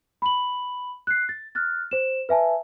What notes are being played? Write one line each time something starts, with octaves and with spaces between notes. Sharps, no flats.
B5 F#7
F#6 C7
A6
F6 F#6 A6
C5 E7
B4 E5 G#5 A5